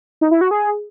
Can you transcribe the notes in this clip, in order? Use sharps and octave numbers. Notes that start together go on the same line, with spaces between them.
D#4
E4
F#4
G#4